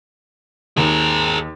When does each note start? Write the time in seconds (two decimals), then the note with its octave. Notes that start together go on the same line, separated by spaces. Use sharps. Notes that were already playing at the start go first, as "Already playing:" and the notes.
0.77 D#2 G#4 A#4